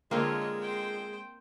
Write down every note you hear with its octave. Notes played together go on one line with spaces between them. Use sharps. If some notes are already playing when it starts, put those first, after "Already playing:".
D3 G#3 A#3 C4 F4 C#5 D#5
C5 G5